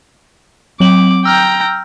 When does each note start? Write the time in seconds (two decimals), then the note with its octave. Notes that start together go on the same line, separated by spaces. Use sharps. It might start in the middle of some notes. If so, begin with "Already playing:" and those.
0.80 F#3 C4 D6 F#7
1.25 G5 A#5 E6 F6 G6